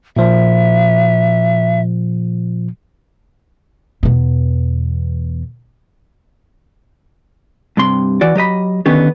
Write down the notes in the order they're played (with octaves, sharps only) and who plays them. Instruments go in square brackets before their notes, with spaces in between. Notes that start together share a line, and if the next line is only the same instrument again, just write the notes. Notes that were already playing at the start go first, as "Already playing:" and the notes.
[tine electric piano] A#2 F3 [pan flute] E5
[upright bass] E2 B2
[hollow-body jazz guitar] G2 C3 C6
E3 F#4 D5
F#3 G4 D#5 B5
D3 D#3 B3 C#4 G4